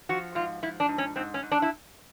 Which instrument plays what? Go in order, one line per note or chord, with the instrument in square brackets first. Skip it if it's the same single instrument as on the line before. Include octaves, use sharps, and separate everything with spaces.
[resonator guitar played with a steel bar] F3 F#4
G#2 F4
F3 E4
D4
G#2
C#4
G#2 C4
C#4
G#2
D4
E4